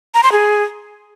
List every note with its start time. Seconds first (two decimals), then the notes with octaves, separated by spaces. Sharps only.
0.14 A#5
0.23 C6
0.32 G#4